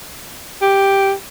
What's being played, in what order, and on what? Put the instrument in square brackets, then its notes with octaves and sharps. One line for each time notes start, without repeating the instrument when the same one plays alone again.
[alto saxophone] G4